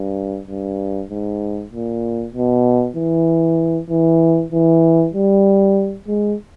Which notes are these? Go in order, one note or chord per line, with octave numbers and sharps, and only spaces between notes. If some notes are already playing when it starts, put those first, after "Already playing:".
Already playing: G2
G2
G#2
A#2
B2
E3
E3
E3
G3
G#3